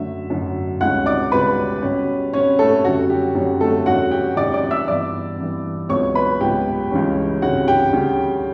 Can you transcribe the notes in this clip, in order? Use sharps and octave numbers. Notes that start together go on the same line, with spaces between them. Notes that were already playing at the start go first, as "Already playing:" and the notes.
Already playing: F#2 D3 F#3 A3 E5
F#2 D3 F#3 A3
C#2 B2 G3 C#4 F#5 F#6
D5 D6
C#2 B2 G3 C#4 B4 B5
B2 G3 C#4
B2 G3 C#4 C#5
A3 A4
F#2 D3 G3 C#4 F#4
G4
F#2 D3 G3 C#4
A3 A4
E2 B2 G3 C#4 F#4 F#5
G4 G5
E2 B2 G3 C#4 D5 D6
D5 D6
E5 E6
G2 E3 B3 D5 D6
G2 E3 B3
C#2 B2 F#3 B3 C#5 C#6
B4 B5
C#2 B2 F#3 B3 G4 G5
C#2 C#3 E3 G3 C#4
C#2 C#3 E3 G3 C#4 F#4 F#5
G4 G5
D2 C#3 G3 C#4